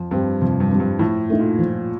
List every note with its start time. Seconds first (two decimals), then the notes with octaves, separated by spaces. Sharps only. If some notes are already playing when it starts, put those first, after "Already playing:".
Already playing: F2
0.11 G2 G3 C4
0.41 F2 C3
0.60 G2
0.71 G3 C4
0.80 G2
0.99 A2 F3
1.30 A3 D#4
1.40 A#2
1.59 F3